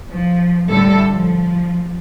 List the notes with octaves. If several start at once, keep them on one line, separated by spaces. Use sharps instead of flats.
F3
A2 D3 G3 A4
F3